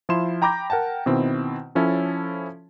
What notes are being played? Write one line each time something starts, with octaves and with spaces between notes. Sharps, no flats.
F3 E4 F5 C6 E7
G5 A#5 B5 D6 G6 A#6
A#4 F#5 G5 A5
B2 D#3 C4 E4
F3 C#4 E4 A4 C#5